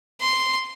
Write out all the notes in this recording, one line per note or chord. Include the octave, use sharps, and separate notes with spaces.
C6